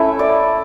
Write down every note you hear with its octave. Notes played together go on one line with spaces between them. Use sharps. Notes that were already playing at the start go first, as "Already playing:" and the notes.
Already playing: A3 C#4 E4 E5
D5